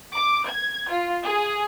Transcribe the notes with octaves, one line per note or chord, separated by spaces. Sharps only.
D6
G#6
F4
G#4